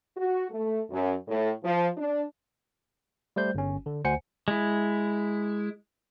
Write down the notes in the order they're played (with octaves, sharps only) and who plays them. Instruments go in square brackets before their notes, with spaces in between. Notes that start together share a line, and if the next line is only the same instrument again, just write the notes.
[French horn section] F#4
A3
F#2
A2
F3
D4
[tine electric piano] G3 A3 C5 G6
G1 C#4
D3
D2 C5 F#5 G#5 C#7
[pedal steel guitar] G#3 E4